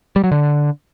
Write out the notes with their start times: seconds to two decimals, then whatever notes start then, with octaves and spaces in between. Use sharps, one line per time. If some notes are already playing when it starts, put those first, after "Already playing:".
0.16 G3
0.24 F#3
0.31 D3